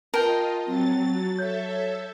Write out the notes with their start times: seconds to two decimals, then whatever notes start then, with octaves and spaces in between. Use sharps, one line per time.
0.14 F4 A#4 D#5 G5 A5
0.67 F#3 C4 A6
1.39 A4 C#5 E5 G6